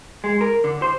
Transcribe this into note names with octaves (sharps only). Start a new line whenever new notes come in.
G#3
A#4
D3
C5